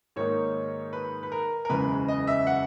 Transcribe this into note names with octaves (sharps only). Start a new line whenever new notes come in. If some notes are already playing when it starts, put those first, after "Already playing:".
G#2 D#3 A#3 D#4 C#5
B4
B4
A#4
A#4
F#1 E2 C#3 G#3 B4
D#5
E5
F#5